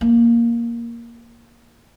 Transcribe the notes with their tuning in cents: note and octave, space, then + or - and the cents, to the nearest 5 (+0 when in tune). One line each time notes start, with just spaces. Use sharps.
A#3 +5